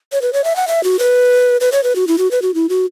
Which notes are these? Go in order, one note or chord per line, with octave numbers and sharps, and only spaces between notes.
C#5
B4
C#5
E5
F#5
E5
F#4
B4
B4
C#5
B4
F#4
E4
F#4
B4
F#4
E4
F#4